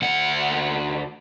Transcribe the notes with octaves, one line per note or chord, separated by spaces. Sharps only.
D2 F#5